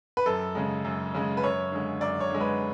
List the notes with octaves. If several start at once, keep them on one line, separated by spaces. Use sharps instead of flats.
B4
F#2 A4
C#3 G#3
F#2
C#3 G#3
B4
F#2 C#5
D3 G#3
F#2 D5
C#5
D3 G#3
B4